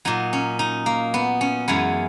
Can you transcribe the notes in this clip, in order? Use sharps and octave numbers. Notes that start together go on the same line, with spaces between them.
A#2 F#3 D#4
C#4
D#4
A#3
B3
C#4
F#2 E3 G#3 B3